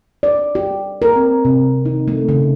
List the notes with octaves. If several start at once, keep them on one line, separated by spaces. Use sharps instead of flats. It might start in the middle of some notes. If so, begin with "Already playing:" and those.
D5
G4
A#4
C4
C3
D#4
A3
C#3